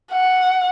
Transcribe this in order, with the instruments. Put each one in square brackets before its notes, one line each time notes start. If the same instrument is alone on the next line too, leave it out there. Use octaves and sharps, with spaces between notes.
[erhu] F#5